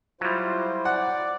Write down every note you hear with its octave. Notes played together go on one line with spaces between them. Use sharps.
F#3 G3 E4 F4 C5
D5 F#5